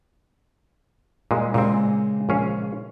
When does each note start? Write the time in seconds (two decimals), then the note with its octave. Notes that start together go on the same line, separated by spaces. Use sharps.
1.31 A#2 G3 G#3
1.54 A#2 C#3 G#3 C4
2.29 A#1 C#4 F5